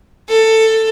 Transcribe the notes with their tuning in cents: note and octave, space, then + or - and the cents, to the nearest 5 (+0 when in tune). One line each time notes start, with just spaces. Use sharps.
A4 +15